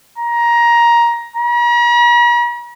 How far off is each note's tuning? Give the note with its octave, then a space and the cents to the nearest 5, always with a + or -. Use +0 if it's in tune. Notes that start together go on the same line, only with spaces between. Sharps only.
A#5 +15
A#5 +45